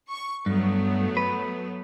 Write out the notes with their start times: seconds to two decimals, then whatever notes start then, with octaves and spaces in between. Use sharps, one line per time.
0.10 C#6
0.46 G2 F#3 A3 B3
1.17 B4